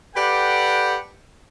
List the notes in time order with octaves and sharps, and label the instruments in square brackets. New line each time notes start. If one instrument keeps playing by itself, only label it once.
[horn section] G4 A4 B4 D5 F#5 G5